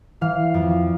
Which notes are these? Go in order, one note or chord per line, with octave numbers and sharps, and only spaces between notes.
E3 F5
F2